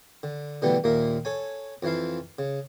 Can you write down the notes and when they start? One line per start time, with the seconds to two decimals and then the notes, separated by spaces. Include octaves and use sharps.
0.23 D3
0.62 B2 D3 E3 G3 A3 B3
0.84 D#2 A#2 A#3 A#4 E5
1.25 A4 C#5 G#5
1.83 F2 E3 F3 E4 F5
2.39 C#3